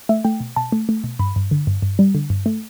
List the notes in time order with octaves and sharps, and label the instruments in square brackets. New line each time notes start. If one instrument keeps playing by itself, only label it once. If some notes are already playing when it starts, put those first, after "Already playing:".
[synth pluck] A3 E5
A3 G5
B2
B2 A5
A3
A3
B2
G2 B5
G2
D3
G2
G2
G3
D3
G2
A3